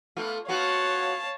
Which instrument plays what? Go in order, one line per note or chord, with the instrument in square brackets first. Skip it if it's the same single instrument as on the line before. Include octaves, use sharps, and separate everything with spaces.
[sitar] A3 B3 F4
[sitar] B3 F4 F#4 [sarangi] C#5 [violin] F5 A5